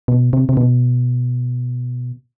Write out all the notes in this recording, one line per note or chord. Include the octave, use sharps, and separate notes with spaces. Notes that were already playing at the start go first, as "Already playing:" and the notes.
B2
C3
C3
B2